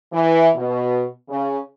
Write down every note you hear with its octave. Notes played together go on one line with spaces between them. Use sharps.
E3
B2
C#3